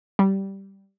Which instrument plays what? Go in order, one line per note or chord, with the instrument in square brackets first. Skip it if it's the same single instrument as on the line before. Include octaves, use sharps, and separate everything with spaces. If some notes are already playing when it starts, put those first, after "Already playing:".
[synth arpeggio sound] G3